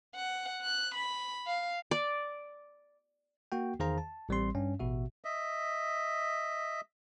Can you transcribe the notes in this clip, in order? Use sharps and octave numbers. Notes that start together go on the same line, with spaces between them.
F#5
F#6
B5
F5
D5
A#3 F#4 G5
E2 D#3 G#4 C5 F5 A#5
A5
A1 G3 C4 C6
G2 C#4
A1 B2 F#4 E5
D#5 E5